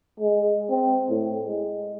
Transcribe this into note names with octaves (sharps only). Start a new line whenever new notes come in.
G#3
C4
A2
G#3